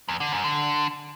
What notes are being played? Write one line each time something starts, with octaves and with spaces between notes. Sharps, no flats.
E2
D3
F#2
D3